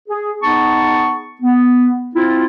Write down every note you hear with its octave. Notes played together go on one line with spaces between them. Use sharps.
G#4
B3 D#4 G#4 A5 C#6
B3
C4 E4 F4